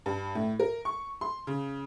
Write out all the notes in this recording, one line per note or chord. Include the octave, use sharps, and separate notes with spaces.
G2
A2
A#4
C#6
C6
C#3